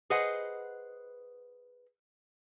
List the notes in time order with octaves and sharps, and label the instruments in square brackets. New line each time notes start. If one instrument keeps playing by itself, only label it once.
[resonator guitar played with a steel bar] G#4 B4 C5 D#5 F#5